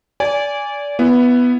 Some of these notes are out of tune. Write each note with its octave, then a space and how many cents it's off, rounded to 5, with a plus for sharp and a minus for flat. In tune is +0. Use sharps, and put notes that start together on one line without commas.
D5 -25 G#5 -15
B3 +0 E4 +20